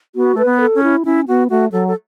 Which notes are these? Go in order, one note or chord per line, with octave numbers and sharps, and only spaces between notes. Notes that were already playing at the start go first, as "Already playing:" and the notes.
B3 F#4
A3 B4
B3
A4
C#4
E4
C#4 E4
B3 F#4
A3 F#4
F#3 A4
A4